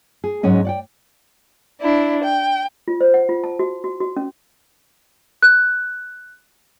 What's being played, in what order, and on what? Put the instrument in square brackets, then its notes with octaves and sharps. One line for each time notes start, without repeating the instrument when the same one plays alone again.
[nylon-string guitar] G#4
G#2 F#3 G#3 C#4 D#5
D5 F#5 G5
[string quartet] D4 E4
G5
[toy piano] F4
C5
F#5
F4
A5
F#4
F#4
F#4
C#4
[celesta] F#6